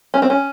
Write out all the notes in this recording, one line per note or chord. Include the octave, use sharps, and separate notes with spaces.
C#4
C4
C#4